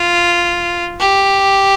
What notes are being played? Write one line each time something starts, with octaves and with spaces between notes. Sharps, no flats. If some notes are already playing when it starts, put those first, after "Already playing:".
Already playing: F4
G4